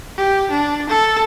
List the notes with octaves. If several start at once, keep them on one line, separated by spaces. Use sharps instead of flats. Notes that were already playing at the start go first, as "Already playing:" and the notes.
G4
D4
A4